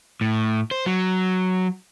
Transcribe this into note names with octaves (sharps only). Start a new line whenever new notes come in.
A2
C5
F#3